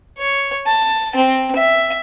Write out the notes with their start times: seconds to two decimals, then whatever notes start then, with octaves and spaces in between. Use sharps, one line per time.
0.18 C#5
0.67 A5
1.16 C4
1.56 E5